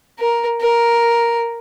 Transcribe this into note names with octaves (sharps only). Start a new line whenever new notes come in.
A#4
A#4